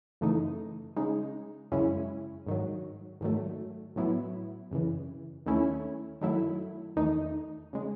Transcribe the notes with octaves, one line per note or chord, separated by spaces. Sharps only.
F#2 C#3 E3 A3 D#4
C#3 G#3 D#4
F#2 C#3 G#3 C#4 E4
G#2 D#3 F#3
G#2 D#3 F#3 A3
A2 F#3 B3 E4
F#2 C#3 E3
D#2 D#3 A3 C#4 E4
F#2 D#3 F#3 A3 E4
E2 D#3 A3 D#4
C#3 G#3